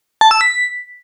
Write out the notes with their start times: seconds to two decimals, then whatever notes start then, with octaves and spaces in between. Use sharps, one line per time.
0.21 A5
0.31 E6
0.41 B6